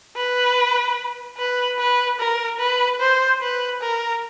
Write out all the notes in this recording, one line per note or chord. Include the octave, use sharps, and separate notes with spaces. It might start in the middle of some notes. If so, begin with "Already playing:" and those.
B4
B4
B4
A#4
B4
C5
B4
A#4